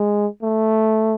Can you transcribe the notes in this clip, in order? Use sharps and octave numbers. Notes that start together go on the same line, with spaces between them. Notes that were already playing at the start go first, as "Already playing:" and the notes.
Already playing: G#3
A3